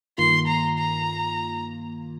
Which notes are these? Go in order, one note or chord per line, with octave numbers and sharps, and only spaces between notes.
G2 D#3 A#3 F4 C6
A#5
A#5